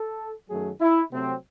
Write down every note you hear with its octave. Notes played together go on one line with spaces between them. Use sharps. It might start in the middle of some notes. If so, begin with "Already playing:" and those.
Already playing: A4
F#2 D#3 F#3 A3 G#4
E4
C3 F#3 A3 C4